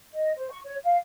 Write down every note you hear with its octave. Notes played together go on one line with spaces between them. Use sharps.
D#5
C5
C#6
C#5
F5